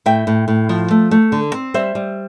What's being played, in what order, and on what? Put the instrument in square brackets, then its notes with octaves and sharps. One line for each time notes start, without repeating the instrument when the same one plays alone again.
[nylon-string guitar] A2 E5 G5
A2
A2
F3
A3
A3
D3
C4
G3 C5 E5
G3